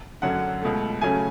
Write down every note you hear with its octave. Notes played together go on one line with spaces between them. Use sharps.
F#2 D3 F#3 C#4 F#5
C#2 B2 A3
C#3 F#3 A3 C#4 G#5